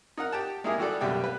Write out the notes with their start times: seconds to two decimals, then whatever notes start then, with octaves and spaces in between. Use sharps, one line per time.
0.18 D#4 A#4 F#5
0.32 G4 G5 A5
0.64 G#3 A#3 D#4 E4 G4 G#4
0.78 E3 G3 F#4 G4 A4 D5
1.01 B1 F#2 G3 A3 G4
1.24 B4